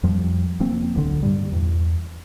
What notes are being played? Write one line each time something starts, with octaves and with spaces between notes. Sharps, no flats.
F2 F3 G3
F1 F3 A#3 C4
D1 B1 D3
G2 A#2 G3
E2